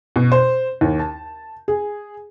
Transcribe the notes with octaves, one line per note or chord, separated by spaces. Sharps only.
B2
C5
D#2
A5
G#4